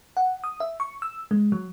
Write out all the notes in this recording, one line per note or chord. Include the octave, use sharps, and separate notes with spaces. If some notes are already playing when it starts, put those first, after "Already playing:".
F#5
D#6
E5
C#6
E6
G#3
F#3